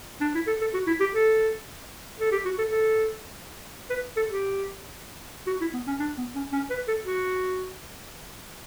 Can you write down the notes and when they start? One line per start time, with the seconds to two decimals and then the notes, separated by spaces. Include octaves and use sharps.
0.21 D4
0.35 E4
0.47 A4
0.61 A4
0.74 F#4
0.87 E4
1.00 G4
1.13 A4
2.20 A4
2.32 G4
2.45 F#4
2.58 A4
2.71 A4
3.90 B4
4.17 A4
4.29 G4
5.47 F#4
5.61 E4
5.74 B3
5.87 C#4
5.99 D4
6.18 B3
6.35 C#4
6.53 C#4
6.70 B4
6.88 A4
7.05 F#4